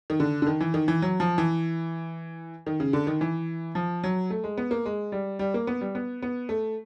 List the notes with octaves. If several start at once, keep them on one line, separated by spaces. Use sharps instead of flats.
D#3
D3
D3
D#3
E3
D#3
E3
F#3
F3
E3
D#3
C#3
D3
D#3
E3
F3
F#3
A3
G#3
B3
A#3
G#3
G3
G3
A#3
B3
G3
B3
B3
A3